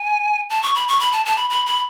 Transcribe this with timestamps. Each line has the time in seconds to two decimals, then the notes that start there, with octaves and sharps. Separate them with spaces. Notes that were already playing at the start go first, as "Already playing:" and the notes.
Already playing: G#5
0.50 A5
0.63 C#6
0.75 B5
0.88 C#6
1.00 B5
1.12 A5
1.25 A5
1.37 B5
1.50 B5
1.66 B5